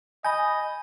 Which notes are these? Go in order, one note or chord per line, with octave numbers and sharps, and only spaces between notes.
D#5 G#5 B5 G6